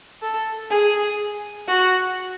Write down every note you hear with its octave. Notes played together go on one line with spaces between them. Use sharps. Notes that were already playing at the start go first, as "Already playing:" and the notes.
A4
G#4
F#4